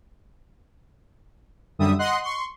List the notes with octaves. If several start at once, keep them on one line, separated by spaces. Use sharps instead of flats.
F#2 D3 G3 E5 D#6
D#5 F#5 C6 F#6
C6 C#6